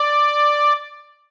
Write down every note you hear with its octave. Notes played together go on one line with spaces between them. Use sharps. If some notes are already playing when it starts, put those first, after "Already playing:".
Already playing: D5